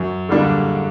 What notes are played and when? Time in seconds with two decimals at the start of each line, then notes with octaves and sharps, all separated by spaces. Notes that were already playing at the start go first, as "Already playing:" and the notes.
Already playing: F#2
0.29 D3 G3 A#3 D4